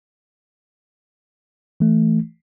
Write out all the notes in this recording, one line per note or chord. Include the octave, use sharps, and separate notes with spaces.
E3 A3